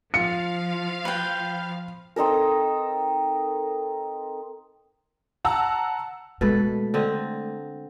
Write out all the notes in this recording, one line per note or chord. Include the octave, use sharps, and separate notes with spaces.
F3 F4 F5 C#7
B4 G5
C4 D#4 A4 A#4
F#5 A5 A#5 E6
B2 G#3 A3 A4 B4
D3 C4 D#5